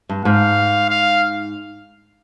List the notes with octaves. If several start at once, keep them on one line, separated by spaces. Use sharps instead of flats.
G2
G#2 F5
F5